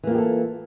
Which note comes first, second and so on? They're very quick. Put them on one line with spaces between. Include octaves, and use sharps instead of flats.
E3 A#3 F4 G4 A4